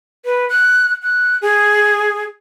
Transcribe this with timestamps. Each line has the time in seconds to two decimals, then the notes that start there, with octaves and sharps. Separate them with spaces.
0.25 B4
0.49 F#6
1.03 F#6
1.42 G#4